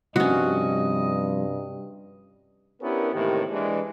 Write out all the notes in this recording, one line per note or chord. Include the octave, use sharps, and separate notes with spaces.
G2 C3 F3 G3 C#4 F#4 D#5
B3 C#4 D4 E4 G4 A#4
A2 C3 D#3 E3 A#3 G4
E3 G#3 D4